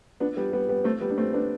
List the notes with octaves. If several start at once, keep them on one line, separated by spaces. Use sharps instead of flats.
B3 D4
G3 B3
G3 B3
G3 B3
A3 C4
G3 B3
D4
A3 C4
B3 D4